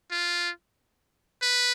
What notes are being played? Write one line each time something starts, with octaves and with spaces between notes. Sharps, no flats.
F4
B4